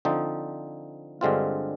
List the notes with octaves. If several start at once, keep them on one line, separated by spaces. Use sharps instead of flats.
D3 F3 C4 D#4
G2 D3 G#3 C4 F4